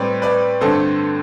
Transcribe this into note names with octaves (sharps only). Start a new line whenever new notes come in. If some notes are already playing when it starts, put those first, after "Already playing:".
Already playing: A2 G3 C4 B4 D5
B4 D5
G2 D3 A3 C4 A4 C5